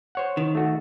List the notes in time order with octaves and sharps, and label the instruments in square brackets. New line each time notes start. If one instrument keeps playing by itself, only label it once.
[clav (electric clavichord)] C5 C#5 F#5
[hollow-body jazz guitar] D#3
[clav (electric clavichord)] A3 F#4